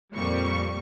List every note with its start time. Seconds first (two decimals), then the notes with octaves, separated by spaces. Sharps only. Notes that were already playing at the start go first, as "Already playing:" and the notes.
0.13 F2 A#2 G3 C#6